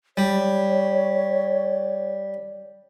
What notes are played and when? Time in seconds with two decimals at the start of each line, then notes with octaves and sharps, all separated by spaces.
0.17 G3 C#5